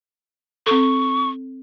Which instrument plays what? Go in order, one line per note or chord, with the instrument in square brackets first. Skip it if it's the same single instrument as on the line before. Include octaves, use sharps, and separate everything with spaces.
[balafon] C4 A4 [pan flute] C#6